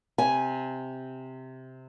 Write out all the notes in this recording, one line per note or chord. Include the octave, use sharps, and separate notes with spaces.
C3 G#5